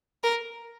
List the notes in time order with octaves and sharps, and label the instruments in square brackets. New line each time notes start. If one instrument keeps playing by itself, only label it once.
[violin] A#4